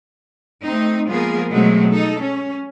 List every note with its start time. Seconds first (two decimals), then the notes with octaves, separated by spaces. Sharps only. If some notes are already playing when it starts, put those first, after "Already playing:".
0.62 A3 C4 D#4
1.08 F3 G#3 A#3 B3 G#4 A#4
1.51 B2 F#3 G#3 A3 C4
1.90 D#4 A4
2.21 C#4